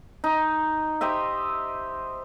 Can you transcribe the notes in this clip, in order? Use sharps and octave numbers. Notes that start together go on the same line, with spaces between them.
D#4
G4 C5 D#5 E5